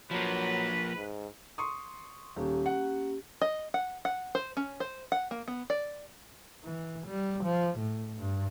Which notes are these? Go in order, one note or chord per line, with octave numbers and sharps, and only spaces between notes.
F3 F#3 A#3 B4
G#2
C6 C#6 D#6
D#1 A#3 C#4 G4
F#5
D#5
F#5
F#5
C5
C#4
C5
F#5
A#3
B3
D5
E3
G3
F3
A2
G2